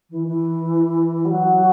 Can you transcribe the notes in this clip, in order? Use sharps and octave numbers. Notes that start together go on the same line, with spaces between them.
E3
E3
G3
F#3